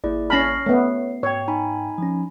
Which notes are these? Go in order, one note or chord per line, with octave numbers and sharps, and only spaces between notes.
G#1 A#3 E4 G#4 D5
C#4 A5 B5 F6 A#6 C7
A3 B3 C#5 C7
G#2 C#5 G5
D#4 G#5 B5
F3 C#4